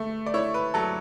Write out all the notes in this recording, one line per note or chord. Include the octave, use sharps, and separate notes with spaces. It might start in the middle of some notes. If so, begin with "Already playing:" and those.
Already playing: A3
D5
E4 C#5
B4
F#3 A4